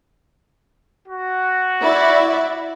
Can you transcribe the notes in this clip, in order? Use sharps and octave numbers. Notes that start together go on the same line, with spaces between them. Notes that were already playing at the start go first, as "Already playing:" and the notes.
F#4
E4 D5 E5